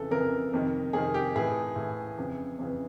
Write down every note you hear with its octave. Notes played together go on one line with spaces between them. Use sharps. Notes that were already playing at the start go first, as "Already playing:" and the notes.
Already playing: F2 C#3 E3 A4
F2 C#3 E3 A#4
F2 C3 D#3
F2 C3 D#3 G#4
G4
A2 E3 G#4
A2 E3
F2 C#3 E3
F2 C#3 E3